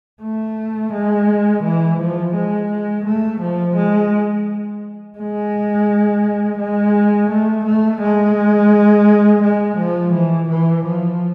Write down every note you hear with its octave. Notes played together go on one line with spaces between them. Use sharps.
A3
G#3
E3
F3
G#3
A3
F3
G#3
G#3
G#3
A3
A3
G#3
G#3
F3
E3
E3
F3